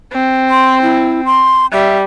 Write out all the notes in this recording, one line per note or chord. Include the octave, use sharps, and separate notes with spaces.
C4
C6
E4
C6
G3 E5